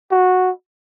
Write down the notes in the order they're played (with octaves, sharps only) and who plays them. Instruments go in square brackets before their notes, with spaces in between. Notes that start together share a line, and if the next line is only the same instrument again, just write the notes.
[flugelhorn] F#4